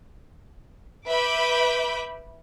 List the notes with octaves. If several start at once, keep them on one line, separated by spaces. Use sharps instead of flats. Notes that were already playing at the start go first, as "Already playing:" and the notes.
B4 E5 B5 D6 G6